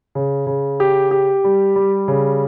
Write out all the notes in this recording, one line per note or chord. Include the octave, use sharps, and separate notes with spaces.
C#3
C#3
G4
G4
G3
G3
C#3